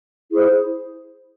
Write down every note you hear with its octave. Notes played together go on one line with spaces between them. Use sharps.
E4 G#4 C5